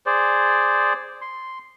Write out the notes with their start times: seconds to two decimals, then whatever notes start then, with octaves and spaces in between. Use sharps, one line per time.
0.06 G#4 C5 D5
1.21 C6